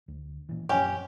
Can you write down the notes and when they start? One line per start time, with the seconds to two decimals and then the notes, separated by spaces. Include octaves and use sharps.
0.08 D2
0.49 A#2 E3
0.69 F#2 F3 C#4 G4